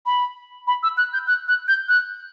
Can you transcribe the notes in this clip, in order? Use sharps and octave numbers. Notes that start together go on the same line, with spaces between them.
B5
B5
E6
F#6
G6
F#6
F#6
G6
F#6